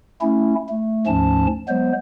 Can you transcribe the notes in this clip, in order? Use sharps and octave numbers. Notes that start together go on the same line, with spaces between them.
A3 C#4 E4
A3
D2 G#2 F3 C#4 A5
F#3 G#3 B3 C5